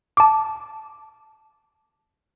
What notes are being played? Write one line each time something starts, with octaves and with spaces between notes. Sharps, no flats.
A5 D6